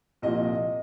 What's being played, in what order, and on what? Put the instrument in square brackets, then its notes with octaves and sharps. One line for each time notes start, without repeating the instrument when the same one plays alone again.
[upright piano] C2 A#2 F3 D#5